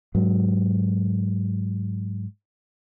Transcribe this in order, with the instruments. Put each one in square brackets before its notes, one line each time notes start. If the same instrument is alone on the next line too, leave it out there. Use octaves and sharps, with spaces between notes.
[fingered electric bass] G#2 F#3